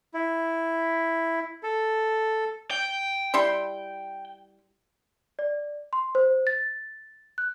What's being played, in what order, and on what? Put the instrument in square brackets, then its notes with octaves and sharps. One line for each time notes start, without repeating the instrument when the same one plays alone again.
[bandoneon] E4
A4
[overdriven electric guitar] G5
[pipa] G3 E4 C6
[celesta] D5
C6
C5
A6
F#6